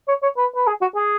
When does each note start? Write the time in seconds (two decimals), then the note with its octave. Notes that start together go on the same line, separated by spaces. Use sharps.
0.09 C#5
0.23 C#5
0.37 B4
0.56 B4
0.67 G#4
0.82 F#4
0.96 G#4